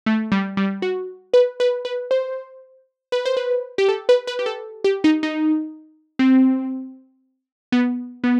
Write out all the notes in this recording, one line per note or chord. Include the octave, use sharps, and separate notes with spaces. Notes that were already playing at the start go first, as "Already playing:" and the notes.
A3
G3
G3
F#4
B4
B4
B4
C5
B4
C5
B4
G4
A4
B4
B4
G4
A4
G4
D#4
D#4
C4
B3
B3